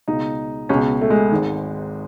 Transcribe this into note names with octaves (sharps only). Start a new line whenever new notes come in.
C#2 B2 D#4
C#2 B2 C#4
A3
G#3
G#1 G#2 D#3